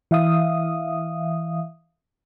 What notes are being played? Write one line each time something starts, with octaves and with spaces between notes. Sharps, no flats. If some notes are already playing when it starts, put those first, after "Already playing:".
E3 E5 F5 D#6